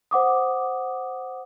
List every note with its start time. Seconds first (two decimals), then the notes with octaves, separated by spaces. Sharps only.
0.11 C5 F#5 D6 D#6